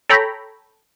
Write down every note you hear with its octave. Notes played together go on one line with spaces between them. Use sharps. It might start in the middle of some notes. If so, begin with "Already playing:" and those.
A4 C#5 G5 A#5 B5